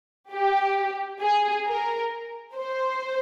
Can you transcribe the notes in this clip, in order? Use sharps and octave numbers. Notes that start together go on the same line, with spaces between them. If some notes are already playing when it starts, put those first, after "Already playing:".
G4
G#4
A#4
C5